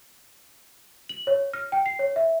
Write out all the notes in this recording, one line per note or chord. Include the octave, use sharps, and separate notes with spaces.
F#7
C#5
F6
G5
C7
C#5
E5